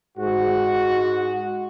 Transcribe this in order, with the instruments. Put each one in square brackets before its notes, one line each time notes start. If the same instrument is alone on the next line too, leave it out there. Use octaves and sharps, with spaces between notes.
[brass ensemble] G#2 F#4